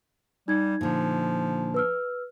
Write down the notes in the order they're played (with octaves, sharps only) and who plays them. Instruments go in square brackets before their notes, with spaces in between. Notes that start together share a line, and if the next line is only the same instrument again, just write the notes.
[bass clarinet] G3 [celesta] D#4 G#6
[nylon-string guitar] A#2 D3 [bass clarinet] F3
[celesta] B4 E6 F6